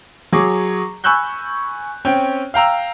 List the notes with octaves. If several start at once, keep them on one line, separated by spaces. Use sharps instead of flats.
F#3 G#4 C#6 D6
G#5 B5 C#6 E6 F#6 G6
C4 C#4 C#5 G5
F5 G5 A#5 E6